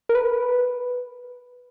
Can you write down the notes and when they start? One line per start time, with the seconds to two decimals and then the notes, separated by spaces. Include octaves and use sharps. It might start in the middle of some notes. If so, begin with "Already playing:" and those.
0.09 A#4
0.15 B4